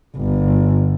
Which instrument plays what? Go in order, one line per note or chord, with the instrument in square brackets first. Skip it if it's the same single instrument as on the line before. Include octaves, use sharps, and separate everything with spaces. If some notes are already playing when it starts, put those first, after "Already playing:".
[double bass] G1